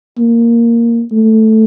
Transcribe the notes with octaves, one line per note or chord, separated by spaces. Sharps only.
A#3
A3